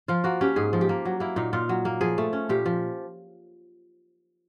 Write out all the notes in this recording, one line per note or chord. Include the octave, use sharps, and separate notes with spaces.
F3 F4
A#3 F#4
C#4 G4
G#2 G#4
F3
G4
A#3
F#3
A#3 E4
A#2 D#4
A#2 F4
F#3
A#3
F3 G#4
A3
C#4
A#2 G4
F3